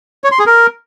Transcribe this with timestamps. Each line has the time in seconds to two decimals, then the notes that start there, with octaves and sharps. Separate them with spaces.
0.24 C#5
0.32 C6
0.39 G#4
0.47 A#4